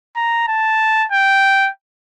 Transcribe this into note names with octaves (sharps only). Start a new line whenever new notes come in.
A#5
A5
G5